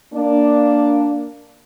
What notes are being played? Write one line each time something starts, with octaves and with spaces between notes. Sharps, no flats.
A#3 D4